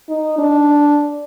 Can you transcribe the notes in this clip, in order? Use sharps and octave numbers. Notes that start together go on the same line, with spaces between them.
D#4
D4